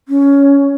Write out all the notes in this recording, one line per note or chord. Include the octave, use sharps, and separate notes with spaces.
C#4